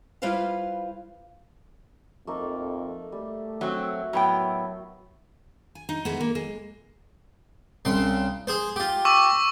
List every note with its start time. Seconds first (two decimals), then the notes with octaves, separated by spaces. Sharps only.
0.22 G3 E4 F4 B4 C5 F5
2.27 F2 A3 A#3 D#4
3.12 G3 A3
3.61 F#3 C4 F#4 E5
4.13 A2 F#3 B3 G5
5.75 G#5
5.89 D#4
6.05 E3 G#3 B3
6.21 A#3
6.35 G#3
7.85 C2 C#3 C6
8.47 G#4 C5
8.76 F4 G4
9.05 C#6 D6 E6